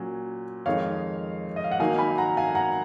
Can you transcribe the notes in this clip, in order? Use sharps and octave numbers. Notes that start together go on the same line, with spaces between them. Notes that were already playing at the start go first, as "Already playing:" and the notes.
Already playing: A#2 F#3 C#4
F2 D#3 G#3 C#5 F5
D#5
F5
F#5
D#3 F#3 A#3 D#4 F5 G#5
G#5 B5
F#5 A#5
F5 G#5
F#5 A#5